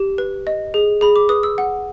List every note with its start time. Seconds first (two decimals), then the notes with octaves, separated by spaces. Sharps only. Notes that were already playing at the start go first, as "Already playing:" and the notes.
Already playing: G4
0.18 B4
0.47 D#5
0.74 G#4
1.01 G#4 B5
1.16 D6
1.29 B4 D#6
1.43 E6
1.58 F#5